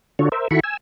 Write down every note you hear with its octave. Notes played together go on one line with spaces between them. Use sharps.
D3 D4 F4 F#4 A4 C#5
A#4 C5 E5
D#3 E4 F#4 A4 B5 C#6
G#5 E6